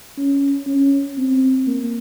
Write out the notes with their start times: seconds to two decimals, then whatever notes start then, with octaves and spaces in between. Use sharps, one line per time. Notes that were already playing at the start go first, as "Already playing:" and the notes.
0.18 C#4
0.67 C#4
1.18 C4
1.67 A#3